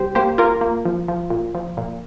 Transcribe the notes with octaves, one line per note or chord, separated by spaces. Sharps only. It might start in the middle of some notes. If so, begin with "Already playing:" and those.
Already playing: C2 G4 C5
A#3 G4 C5
A#3 F4 A#4
A#3
F3
F3
A#2
F3
A#2